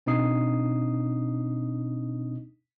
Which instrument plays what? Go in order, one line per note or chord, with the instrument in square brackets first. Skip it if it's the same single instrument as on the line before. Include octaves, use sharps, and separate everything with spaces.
[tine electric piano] B2 C4 D4 D#4 D#6 C7